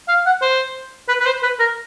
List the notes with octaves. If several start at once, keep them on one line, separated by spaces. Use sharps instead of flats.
F5
F#5
C5
B4
B4
C5
B4
A#4